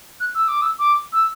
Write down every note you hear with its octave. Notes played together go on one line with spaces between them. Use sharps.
F#6
E6
D6
E6
D6
E6